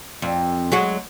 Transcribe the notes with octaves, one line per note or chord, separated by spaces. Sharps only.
F2
F#3 G#3 F#4